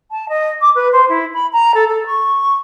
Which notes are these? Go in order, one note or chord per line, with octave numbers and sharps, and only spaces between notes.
A5
D#5
D6
B4
C5
E4
B5
A#5
A4
A4
C#6